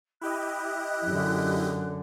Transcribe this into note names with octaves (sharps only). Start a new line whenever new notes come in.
E4 G4 D#5 F#6
F#2 D3